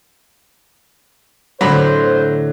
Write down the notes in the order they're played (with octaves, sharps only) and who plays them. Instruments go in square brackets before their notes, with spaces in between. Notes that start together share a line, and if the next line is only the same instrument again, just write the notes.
[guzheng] A2 [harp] D3 C4 D4 [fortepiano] F#3 B5 [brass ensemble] C5